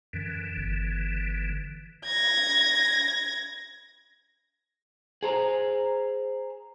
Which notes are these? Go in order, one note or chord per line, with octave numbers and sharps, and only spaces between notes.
F#2 D3 E3
G1
G#6 A#6
G#4 C5 A#5